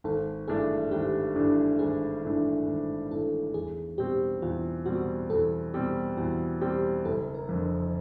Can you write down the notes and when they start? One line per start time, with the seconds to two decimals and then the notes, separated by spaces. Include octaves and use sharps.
0.04 G#1 A4
0.48 G2 E3 A3 D4 G#4
0.91 G#1 G4
1.35 G2 E3 A3 D4
1.79 G#1 G#4
2.23 G2 E3 A3 D4
2.67 G#1
3.11 G2 E3 A3 D4 A4
3.54 E2 G#4
3.98 B2 G3 C4 G4
4.42 E2 F4
4.86 B2 G3 C4 F#4
5.30 E2 A4
5.74 B2 G3 C4 G4
6.17 E2 F#4
6.61 B2 G3 C4 G4
7.05 F#1 A4
7.34 A#4
7.49 F2 D3